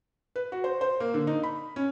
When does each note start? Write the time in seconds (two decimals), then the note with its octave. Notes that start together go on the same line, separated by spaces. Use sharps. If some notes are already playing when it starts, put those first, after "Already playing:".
0.36 B4
0.52 F#4
0.64 C5
0.81 C5
1.00 A#3
1.14 D3
1.27 D#4
1.43 B5
1.76 C#4